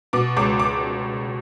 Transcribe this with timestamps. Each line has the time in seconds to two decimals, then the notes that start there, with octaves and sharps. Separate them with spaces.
0.13 B2 D6
0.37 C#2 D6
0.59 D6